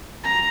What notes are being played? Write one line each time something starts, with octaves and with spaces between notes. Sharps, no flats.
A#5